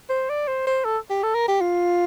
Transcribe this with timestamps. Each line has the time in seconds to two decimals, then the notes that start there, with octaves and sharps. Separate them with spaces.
0.10 C5
0.29 D5
0.48 C5
0.67 C5
0.85 A4
1.10 G4
1.23 A4
1.35 A#4
1.48 G4
1.61 F4